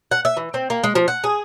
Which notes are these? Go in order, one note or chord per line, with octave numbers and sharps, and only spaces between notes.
F#5
E5
E3
C4
A#3
G#3
F3
F#5
G#4